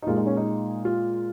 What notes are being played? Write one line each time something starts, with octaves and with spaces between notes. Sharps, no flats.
D#4
A#2 G#3 F4
D#4
C#4
D#4
F4